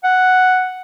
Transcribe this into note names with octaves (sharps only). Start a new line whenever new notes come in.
F#5